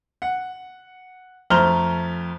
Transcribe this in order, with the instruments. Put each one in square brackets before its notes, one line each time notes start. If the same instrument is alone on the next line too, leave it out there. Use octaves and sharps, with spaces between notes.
[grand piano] F#5
F2 A3 C5 A#5 F6 G7